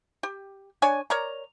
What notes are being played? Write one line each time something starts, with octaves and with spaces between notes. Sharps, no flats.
G4
D4 C#5 D5 G#5
A#4 C#5 D5 A#5